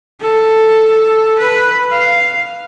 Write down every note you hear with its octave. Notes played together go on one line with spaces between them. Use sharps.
A4
B4
F5